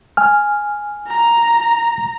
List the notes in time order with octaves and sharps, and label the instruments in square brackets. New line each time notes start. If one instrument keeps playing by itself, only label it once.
[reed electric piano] G#5 F6
[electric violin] A#5